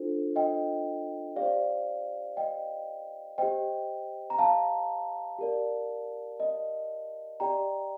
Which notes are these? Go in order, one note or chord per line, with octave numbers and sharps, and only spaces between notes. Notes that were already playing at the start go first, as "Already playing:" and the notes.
Already playing: D4 F4 A4 C5
D#5 G5
G4 D5 F5
C5
D#5 G5
G4 C5 D#5 G5
A#5
F5 A5
G4 A#4 D5
D#5
G4 D5 G5 A#5